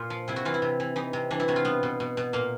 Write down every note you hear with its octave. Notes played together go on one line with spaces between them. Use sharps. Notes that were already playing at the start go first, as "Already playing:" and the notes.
Already playing: A#2 F4
F3
C3 E4
F#4
E3 F4
E4
C3
E3
E3 D#4
C3
E3 D4
E4
C3 F#4
F4
B2 B3
B2
B2
B2
A#2 A#3